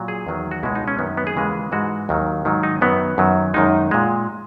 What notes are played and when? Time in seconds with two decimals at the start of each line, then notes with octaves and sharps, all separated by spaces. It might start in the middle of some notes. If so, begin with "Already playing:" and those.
Already playing: A#2 F#3
0.08 G#4
0.27 E2 D#3 F#3
0.51 F#4
0.63 C#2 B2 G#3 E4
0.75 D#4
0.88 C#4
0.99 F#2 D#3 F#3 B3
1.17 B3
1.27 G#4
1.35 D#2 C#3 E3 G#3
1.72 G#2 E3 G#3 F#4
2.09 D#2 D#3 F#3
2.45 G#2 D#3 F#3
2.63 D#4
2.81 F#2 D#3 F#3 B3
3.18 F#2 D#3 F#3
3.54 F#2 D#3 G#3 D#4
3.91 A#2 G#3